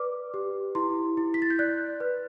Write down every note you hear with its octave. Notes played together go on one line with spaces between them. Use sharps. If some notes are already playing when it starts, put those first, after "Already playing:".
Already playing: B4 D5 D6
G4
E4 C6
E4
B6
A6
G6
D5 F#6
B4